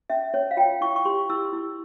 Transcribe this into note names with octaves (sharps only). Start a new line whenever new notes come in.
C#4 E5
C#4 C#5
F5
F4 G5
E4 C#6
C#6
G4 C6
E4 E6
E4